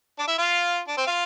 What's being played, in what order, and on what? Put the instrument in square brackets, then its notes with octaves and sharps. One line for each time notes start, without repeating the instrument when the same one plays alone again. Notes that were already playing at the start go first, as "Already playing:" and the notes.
[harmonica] D4 D5
E4 E5
F4 F5
D4 D5
C4 C5
F4 F5